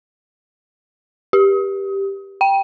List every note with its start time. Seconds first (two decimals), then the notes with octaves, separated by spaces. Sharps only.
1.33 G4
2.41 G5